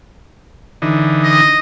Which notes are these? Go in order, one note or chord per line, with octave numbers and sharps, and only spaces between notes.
D3 E3 D#4
D#5